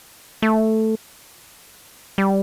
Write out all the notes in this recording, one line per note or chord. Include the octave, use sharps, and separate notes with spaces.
A3
G3